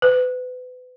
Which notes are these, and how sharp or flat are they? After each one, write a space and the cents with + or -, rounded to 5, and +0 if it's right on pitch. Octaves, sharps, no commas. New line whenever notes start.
B4 +35